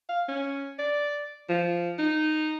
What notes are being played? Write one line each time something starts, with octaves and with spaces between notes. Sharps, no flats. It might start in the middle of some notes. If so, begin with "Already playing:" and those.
F5
C#4
D5
F3
D#4